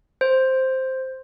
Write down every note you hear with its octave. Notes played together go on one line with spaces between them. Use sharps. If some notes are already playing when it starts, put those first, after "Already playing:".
C5